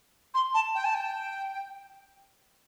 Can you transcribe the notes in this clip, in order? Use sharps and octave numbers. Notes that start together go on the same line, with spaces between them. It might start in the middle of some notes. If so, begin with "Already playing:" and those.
C6
A5
G5
A5
G5